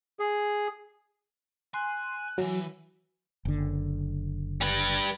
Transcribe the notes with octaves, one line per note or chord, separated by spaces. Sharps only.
G#4
G#5 C6 F#6
D#2 E3 F#3
F#1 D3
G3 B4